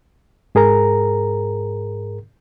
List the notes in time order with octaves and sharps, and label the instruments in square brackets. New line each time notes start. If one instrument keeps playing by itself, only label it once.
[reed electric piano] G#2 G#4 A#4 A#5